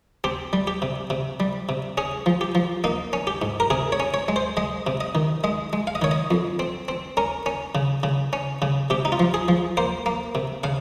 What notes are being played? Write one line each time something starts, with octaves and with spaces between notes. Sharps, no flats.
C4 G4
G3
G4
C3
C3
G3
C3
C#4 G#4
F3
G4
F3
A#3 D#4
C#4
G4
G#2
A#4
C3 G#4
C#5
C#4
C#5
G#3
C5
G#3 D#5
C3
D#5
D#3
G#3 D#5
G#3
F5
D#5
D#3 C#5
D#5
F2
C4
C4
C#4 A#4
C#4
C#3
C#3
C#4
C#3
C3 G4
D#4
F4
F3
G#4
F3
A#3 C5
A#3
C3
C#3 F5